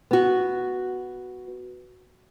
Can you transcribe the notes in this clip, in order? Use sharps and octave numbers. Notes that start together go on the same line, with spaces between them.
B3 F#4